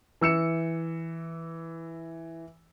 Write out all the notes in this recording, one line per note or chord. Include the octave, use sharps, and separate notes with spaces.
E3 E6 C#7 E7